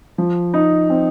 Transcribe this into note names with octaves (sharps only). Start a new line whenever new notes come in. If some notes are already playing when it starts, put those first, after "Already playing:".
F3
D#4
C4